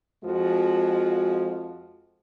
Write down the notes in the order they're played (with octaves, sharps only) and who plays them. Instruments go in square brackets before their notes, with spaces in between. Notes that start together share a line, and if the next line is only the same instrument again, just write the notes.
[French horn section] F2 F3 G#3 F#4